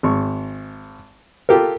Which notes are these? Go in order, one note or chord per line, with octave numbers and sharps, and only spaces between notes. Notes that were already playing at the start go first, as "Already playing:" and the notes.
G#1 C#6
F4 G4 A4 A#4